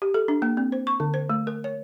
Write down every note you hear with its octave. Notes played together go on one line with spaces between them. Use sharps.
G4
A4
D4
A#3
C4
C5
C#6
D3
C5
A3
A#4
C#5